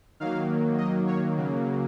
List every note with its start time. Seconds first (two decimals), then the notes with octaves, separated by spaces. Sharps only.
0.20 D#3 F#3 A#3 F5
0.78 D#5
1.07 C#5
1.37 C#3 F#3 A#3